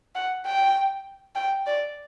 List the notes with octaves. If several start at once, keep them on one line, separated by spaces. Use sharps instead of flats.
F#5
G5
G5
D5